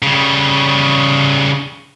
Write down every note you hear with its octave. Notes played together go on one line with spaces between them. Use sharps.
C#3 G3